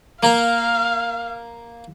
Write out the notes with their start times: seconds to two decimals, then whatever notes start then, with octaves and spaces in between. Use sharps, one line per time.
0.23 A#3 A#4 F5